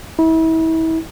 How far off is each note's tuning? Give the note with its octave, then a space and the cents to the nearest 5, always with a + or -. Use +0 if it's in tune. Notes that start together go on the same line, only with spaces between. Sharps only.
E4 -35